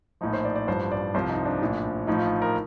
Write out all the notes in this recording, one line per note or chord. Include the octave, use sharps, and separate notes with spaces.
A#1 A2 F3 D#4
C5
D5
D5
A1 G2 F3 C5
D5
C2 C3 F3 C5
D#4
D4
A#1 A2 F3
A1 A2 F3 D#4
F4
A#4